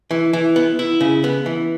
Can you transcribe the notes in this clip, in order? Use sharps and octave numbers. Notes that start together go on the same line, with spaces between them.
E3
E3
B3
E4
C#3
B3
E3